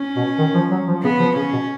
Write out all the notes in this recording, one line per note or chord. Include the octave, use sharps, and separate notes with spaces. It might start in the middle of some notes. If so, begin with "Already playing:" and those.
Already playing: C#4
B2
D#3
F3
F#3
F3
C#3 B3
F3
C#3 C#4
B2